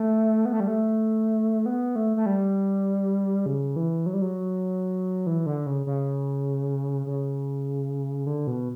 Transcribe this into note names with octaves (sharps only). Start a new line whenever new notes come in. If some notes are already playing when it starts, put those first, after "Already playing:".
Already playing: A3
B3
A3
G3
A3
B3
A3
A3
G3
C#3
E3
F#3
G3
F#3
E3
D3
C#3
C#3
C#3
D3
B2